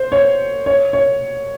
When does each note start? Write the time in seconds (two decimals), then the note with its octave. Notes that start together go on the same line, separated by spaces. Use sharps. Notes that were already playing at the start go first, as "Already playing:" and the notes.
Already playing: C5
0.12 C#5
0.66 C#5
0.93 C#5